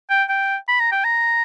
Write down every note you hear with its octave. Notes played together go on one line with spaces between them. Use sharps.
G5
G5
B5
A#5
G5
A#5